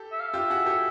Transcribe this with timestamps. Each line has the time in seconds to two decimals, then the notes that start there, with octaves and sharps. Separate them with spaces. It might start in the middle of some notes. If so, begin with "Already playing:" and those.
Already playing: G4 A4
0.12 E5
0.20 F5
0.28 E5
0.34 F4 G4
0.50 F#4 G#4
0.66 G4 A4